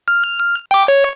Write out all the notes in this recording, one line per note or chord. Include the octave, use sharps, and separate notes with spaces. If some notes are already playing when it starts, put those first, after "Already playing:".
F6
G5 D6
C#5